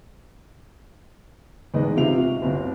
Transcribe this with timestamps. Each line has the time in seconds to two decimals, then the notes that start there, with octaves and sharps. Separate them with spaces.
1.74 E2 G#2 G#3 B3 D#5
1.97 C3 F4 E5 F7
2.18 F#4
2.42 G1 C2